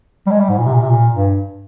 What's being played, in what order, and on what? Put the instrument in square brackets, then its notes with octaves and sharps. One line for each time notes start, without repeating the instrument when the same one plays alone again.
[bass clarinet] G3
G#3
G3
G#2
A#2
C3
A#2
C3
A#2
G2